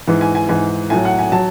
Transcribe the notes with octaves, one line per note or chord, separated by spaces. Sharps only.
G#2 E3
G#5
G#5
G#2 E3 G#5
A2 F#3 G#5
F#5
G#5
F#3 A5